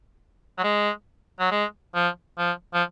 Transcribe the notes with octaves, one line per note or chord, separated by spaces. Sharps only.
F#3
G#3
F#3
G#3
F3
F3
F3